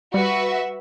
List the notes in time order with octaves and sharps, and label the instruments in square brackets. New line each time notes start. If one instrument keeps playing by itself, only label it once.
[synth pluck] G3 [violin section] F#4 B4 E5